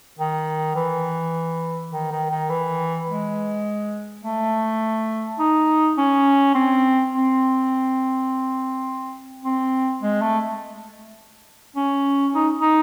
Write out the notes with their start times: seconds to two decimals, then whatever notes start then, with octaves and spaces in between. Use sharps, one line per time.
0.19 D#3
0.76 E3
1.92 D#3
2.11 D#3
2.30 D#3
2.50 E3
3.08 G#3
4.23 A3
5.39 D#4
5.98 C#4
6.55 C4
7.13 C4
9.45 C4
10.02 G#3
10.22 A3
11.76 C#4
12.35 D#4
12.60 D#4